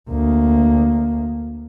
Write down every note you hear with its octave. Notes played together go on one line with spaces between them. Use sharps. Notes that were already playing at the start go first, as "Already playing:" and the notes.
D2 A#3